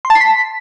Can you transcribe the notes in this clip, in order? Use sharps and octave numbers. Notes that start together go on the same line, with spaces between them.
C6
A5
C7
B6